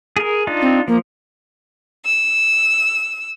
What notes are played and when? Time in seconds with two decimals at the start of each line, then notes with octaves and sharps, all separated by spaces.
0.17 G#4 A#4
0.47 D4 D#4 F4
0.62 C4
0.88 F3 A#3
2.04 E6